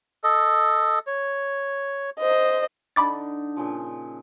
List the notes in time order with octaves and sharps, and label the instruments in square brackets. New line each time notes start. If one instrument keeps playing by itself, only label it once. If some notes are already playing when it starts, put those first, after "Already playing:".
[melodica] A4 D#5
C#5
[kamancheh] C5 D#5
[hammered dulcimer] D3 D4 D#4 [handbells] B5 D6 A6
[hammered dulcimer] A#2 C#3 F3